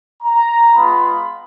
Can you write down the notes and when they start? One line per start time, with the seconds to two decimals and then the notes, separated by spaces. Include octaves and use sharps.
0.23 A#5
0.75 G#3 B3 F4 B5